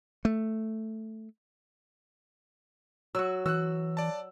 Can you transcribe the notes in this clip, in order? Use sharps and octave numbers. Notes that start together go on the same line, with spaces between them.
A3
F#3 F#4 E6
E3 F#4 E6 F#6
D5 A5